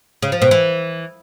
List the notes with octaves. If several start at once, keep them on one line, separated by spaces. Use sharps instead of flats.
C#3
F3
B2
E3